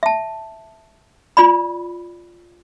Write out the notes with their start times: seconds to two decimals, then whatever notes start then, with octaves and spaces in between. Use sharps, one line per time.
0.03 E5 A5
1.37 F4 D5 B5